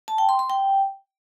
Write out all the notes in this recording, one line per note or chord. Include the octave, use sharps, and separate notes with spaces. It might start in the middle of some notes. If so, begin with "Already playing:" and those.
A5
G5
C6
C6
G5